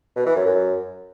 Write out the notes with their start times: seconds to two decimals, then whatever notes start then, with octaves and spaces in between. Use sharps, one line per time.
0.16 B2
0.26 E3
0.36 F#2
0.46 F#2